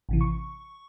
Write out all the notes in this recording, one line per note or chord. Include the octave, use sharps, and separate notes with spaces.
A1 C3 E3
C#6